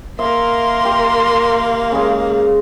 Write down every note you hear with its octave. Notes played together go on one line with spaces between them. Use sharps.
A#3 A#4 E5 C6
G4
C#3 G#3